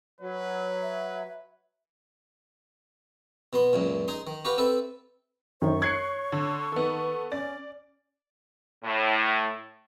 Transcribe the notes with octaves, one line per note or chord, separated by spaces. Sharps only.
F#3 B4 C#5
E5
B2 B3 C6
C#2 F#2 A#2
D#4 G#4 C6
D#3
F#4 G4 B4 F5
C4 A4 B4 E5
F#2 D#3 C5 C#6
C#5 F#6 G#6 C7 C#7
D3
D#3 B3 A4
C#4 D5 A6
A2